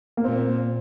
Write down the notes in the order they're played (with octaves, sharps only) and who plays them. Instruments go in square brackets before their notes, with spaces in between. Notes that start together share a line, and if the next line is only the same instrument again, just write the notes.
[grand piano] A#3
[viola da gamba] A#2 [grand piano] C4